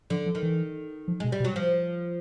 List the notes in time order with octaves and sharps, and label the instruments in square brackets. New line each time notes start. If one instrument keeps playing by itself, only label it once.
[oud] D3 [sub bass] F3
[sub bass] F3
[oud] D#3
[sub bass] E3
F3
[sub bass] B2 [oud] G#3
[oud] G3
[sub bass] B2
[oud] F#3
F3